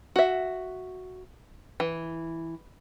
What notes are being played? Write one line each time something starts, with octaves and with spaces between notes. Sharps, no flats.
F#4 E5
E3